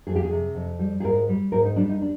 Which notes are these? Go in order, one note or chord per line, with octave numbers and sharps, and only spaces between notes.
F2 G#4
G4
G#4
C3
F2
G3
G#4
G#2 A#4
G3
G#2 A#4
D#4
G3 D4
D#4
D4